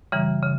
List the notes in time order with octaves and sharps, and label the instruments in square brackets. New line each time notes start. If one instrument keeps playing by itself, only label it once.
[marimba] F#2 C#3 E3 G3
C#3